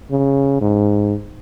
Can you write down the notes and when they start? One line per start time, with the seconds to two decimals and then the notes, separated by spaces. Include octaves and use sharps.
0.11 C#3
0.61 G#2